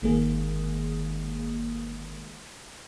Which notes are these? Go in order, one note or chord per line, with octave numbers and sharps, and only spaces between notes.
G1 D#3 G#3 A#3 G#4